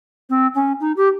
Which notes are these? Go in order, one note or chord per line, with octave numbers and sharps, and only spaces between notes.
C4
C#4
D#4
G4